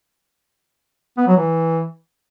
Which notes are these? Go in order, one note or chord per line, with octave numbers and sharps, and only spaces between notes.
B3
F#3
E3